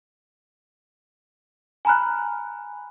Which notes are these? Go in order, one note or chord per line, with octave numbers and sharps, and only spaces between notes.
G#5 A#5 B5 F6 F#6